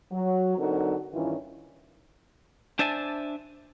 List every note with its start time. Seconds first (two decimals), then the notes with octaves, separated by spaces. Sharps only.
0.12 F#3
0.58 D3 F#3 C4 D#4 F#4 A#4
1.12 G2 D#3 E3 C#4 E4 F4
2.79 D4 C5 D5 E5 G#5 A5